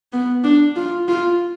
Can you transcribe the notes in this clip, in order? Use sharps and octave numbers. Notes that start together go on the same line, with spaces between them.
B3
D4
F4
F4